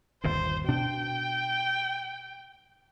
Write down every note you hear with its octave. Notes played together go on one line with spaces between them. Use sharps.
G1 D#2 A#2 C5
B2 D4 G5